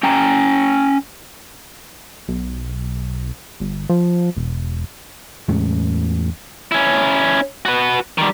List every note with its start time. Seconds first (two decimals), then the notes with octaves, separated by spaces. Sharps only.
0.03 C#4 G5 A#5
2.28 B1
3.60 G1
3.89 F3
4.37 E1
5.48 E2 A2 G#3 C#4
6.72 C#4 E4
7.65 F#4 B4
8.18 D#3 G3